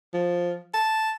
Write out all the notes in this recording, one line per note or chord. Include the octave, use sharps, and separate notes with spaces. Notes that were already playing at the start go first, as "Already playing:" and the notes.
F3
A5